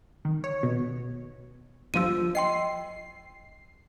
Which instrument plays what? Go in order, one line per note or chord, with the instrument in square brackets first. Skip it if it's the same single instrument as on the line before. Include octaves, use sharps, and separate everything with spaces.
[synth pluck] D#3
C#5
B2
[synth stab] G1 F3 [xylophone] E6 D#7
[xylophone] D#5 G5 C6 [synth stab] C7